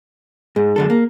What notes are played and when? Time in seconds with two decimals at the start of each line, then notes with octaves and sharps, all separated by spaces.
0.56 G#2 G#4
0.76 F#2 D3 A4
0.90 A#3